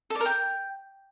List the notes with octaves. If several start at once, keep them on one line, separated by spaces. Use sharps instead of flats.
A4
D5
A#4
G5